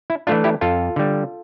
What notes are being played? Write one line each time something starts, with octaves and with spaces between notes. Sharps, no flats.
E4
E3 A3 D4 F4
E4 G4
F2 F4 A4
D3 G3